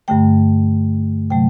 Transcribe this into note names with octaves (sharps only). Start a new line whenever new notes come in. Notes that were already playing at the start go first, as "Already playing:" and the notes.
G2 D3 A3 G5
C3 F#3 A3 G5